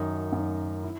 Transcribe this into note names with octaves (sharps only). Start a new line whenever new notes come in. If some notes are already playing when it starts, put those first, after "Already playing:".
Already playing: F#2 D#3 D#4
F#2 D#3
E4